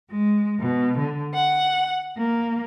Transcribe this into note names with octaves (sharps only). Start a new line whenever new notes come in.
G#3
B2
D3
F#5
A#3